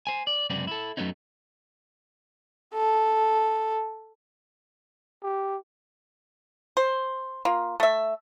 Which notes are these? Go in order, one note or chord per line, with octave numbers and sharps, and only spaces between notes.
C5 G#5
D5
C#2 F#2 C3 B3 C4 D5
E4 A4
F#2 F#3 A3 B3 C#4 D#4
A4
G4
C5
A#3 F4
A3 E5